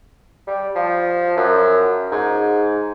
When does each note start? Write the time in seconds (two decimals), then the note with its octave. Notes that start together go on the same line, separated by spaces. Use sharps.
0.47 G3
0.75 F3
1.37 F#2
2.12 G#2